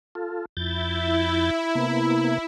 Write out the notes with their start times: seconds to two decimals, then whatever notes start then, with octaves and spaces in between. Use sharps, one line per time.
0.15 F4 A4
0.57 F2 E4 G6 A6
1.75 C3 A#3 B3